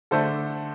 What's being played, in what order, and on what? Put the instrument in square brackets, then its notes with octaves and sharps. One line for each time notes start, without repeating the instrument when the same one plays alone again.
[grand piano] D3 A3 D4 A4 C5